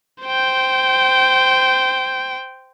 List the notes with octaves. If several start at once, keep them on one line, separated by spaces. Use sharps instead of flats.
C5 G5